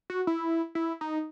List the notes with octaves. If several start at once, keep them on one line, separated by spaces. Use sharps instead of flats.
F#4
E4
E4
D#4